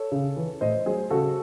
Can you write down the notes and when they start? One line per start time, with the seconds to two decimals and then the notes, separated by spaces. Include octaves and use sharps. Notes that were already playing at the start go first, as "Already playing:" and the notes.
Already playing: A4 C#5
0.12 C#3
0.37 E3
0.61 A2 C5 D#5
0.86 F#3 G#4 C5
1.10 C#3 F#4 A4